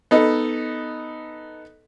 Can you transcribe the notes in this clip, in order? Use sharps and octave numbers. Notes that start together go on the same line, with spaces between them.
B3 D#4 A4